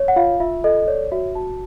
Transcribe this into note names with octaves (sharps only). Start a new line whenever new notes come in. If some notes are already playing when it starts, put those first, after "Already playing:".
Already playing: C#5
F#5
F4 F5
F4 E5
A4 D#5
C#5 D5
F#4 E5
F#4 A5